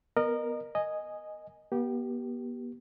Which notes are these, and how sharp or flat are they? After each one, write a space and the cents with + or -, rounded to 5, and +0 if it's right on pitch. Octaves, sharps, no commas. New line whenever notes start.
B3 +0 A#4 +0 D#5 -35
D#5 -5 G#5 +0
B3 -40 G4 -15